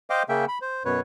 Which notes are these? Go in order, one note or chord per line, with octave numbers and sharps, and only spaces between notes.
C5 D#5 F5 G5 D6
C#3 A#3 C#4 E5 G5
B5
C5
F#2 B2 B4 C#5